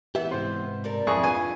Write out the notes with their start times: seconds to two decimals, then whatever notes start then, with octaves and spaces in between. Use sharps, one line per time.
0.15 E3 B3 G4 E5
0.31 G#2 C3 C4 C5
0.84 G2 G3 A#4
1.07 F2 F3 E4 G#4 C#6
1.23 D4 F4 B4 G#5